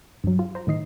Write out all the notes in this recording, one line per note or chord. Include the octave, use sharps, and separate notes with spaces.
G2 F#3
F4
C5 A#5
A2 D#3 D#5 C7